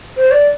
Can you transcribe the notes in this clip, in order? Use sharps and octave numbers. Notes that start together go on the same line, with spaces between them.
C5
D5